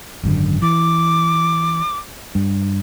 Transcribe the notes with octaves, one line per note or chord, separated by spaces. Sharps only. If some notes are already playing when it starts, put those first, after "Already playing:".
G#1 F#2 D3
E3 D6
G2